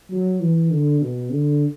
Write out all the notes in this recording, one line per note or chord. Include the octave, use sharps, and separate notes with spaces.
F#3
E3
D3
B2
D3